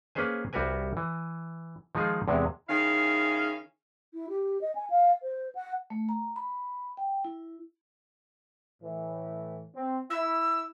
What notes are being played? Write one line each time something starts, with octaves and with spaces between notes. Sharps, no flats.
A#3 C#4 G#4 B4 C5 G#5
C2 G3 F#4 A#4 B4 G#5
E3
D#3 F3 G#3 D#4 F4 G#4
E2 C3 G#3
D#3 C#4 E4 G#4 F5
E4
G4
D#5
G#5
F5
C5
F#5
A3
A#5
B5
G5
E4
A2 E3
C4
E4 E6